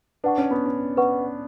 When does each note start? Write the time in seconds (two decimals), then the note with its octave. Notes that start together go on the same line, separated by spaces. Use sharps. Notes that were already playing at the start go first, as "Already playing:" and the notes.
0.24 D4 B4 F#5 C#6
0.38 C#4
0.51 B3
0.65 C#4
0.97 B4 F#5 C#6